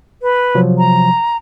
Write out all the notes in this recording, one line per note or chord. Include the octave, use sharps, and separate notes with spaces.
B4
C3 F3 F#3
A#5